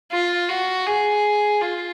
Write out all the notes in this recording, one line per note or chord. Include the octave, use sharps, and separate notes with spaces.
F4
F#4
G#4
F4